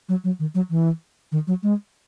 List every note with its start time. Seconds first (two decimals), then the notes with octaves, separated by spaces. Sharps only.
0.09 F#3
0.24 F#3
0.39 D#3
0.55 F#3
0.70 E3
1.32 D#3
1.47 F#3
1.63 G#3